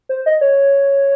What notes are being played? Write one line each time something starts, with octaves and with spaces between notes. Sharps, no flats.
C5
D#5
C#5